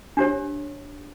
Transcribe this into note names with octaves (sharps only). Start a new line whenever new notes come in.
D4 G4 C#5